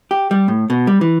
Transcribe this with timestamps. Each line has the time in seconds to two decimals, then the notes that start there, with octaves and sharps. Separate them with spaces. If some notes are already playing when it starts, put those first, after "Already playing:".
0.11 G4
0.31 G3
0.48 A2
0.70 B2
0.87 G3
1.01 E3